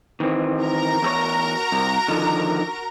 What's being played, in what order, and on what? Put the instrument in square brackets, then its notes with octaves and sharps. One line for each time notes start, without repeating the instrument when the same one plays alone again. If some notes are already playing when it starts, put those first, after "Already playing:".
[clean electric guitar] D#3 E3 C4
[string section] F#4 A#4 A#5
[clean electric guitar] E2 A4 C#5
C2
D3 D#3 F3